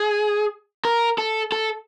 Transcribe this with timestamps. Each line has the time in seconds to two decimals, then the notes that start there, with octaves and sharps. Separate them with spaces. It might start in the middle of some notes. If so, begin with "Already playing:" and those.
Already playing: G#4
0.85 A#4
1.18 A4
1.52 A4